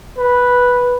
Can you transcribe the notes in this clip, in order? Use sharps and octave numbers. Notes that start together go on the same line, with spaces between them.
B4